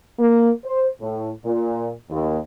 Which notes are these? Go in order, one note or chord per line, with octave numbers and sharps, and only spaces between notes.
A#3
C5
A2
A#2
D#2